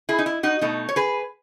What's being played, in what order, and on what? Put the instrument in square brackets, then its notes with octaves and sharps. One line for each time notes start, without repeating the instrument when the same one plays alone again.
[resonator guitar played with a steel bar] E4 G#4
D#4
E4
D#4 F#4
B2 A3 D#4
C#5
G#4 B4